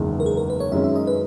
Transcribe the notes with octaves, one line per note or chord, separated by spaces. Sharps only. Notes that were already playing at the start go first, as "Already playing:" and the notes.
Already playing: F#1 E2 D#3 G#3
A#4
G#4
A#4
B4
C#5
F#2 D#3 G#3 C#4 E5
E5
D#5
B4